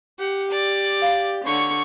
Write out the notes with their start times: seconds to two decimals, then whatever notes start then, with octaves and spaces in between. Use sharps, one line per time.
0.19 G4 F#5
0.50 D5
1.02 F5
1.45 D3 C#5 C#6